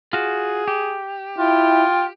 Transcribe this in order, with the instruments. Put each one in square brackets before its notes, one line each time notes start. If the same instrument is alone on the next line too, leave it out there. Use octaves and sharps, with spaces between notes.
[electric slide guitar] F4 F#4 [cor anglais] G#4
[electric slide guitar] G4
[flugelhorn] E4 [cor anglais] F4 [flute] G5